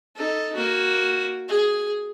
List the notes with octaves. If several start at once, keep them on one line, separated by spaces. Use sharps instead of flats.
D#4 A4
A#3 F#4
G#4